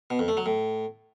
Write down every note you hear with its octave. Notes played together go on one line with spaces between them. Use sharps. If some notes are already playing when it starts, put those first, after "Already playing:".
B2
F2
A3
F#3
A2